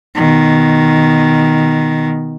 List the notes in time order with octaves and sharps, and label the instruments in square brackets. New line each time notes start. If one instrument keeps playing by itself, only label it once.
[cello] B2 D#3